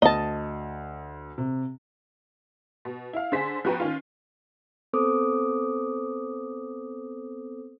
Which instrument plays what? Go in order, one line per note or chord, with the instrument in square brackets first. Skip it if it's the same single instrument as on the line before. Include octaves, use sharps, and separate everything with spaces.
[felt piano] D2 [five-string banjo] D#5 A5
[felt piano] C3
[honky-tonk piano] B2
E4 F5
D3 G#4 C5 B6
F3 B3 F#4 B4 G5 A#5
D#3 C#4 F4
[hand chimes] B3 C4 A4 C5 D6 D#6